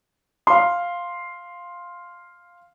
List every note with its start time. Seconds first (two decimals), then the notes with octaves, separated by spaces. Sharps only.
0.47 F5 C6